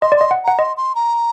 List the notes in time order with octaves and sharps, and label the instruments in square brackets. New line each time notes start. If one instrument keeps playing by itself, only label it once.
[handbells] D#5 [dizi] C6
[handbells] D5
[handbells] D#5 [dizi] C6
[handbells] F#5
[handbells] F#5 [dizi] A#5
[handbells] D#5 [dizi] C6
[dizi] C6
A#5